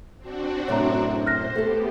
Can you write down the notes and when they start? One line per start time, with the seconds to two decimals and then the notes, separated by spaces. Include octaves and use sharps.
0.19 C4 D4 F#4
0.68 F#2 A2 C3 C#5 A#5
1.27 C5 F6 F#6 A#6
1.56 A3 B3 G4 A4